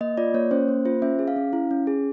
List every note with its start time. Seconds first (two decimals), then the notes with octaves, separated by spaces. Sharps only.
0.01 A#3 D#5
0.18 F4 D5
0.34 A#3 C#5
0.51 C#4 C5
0.68 A#3
0.85 F4 C5
1.02 C#4 E5
1.19 G#4
1.28 F5
1.36 C#4
1.53 E4
1.71 C#4
1.87 G#4